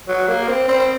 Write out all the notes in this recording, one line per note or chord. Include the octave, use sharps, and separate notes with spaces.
F#3
A#3
C4
C4